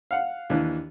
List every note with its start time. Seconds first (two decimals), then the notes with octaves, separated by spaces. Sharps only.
0.11 F5 F#5
0.50 D#2 E3 D4